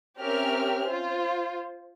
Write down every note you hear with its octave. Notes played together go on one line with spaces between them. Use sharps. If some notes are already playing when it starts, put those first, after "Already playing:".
C4 C#4 G4 A#4 E5 F6
F4 C5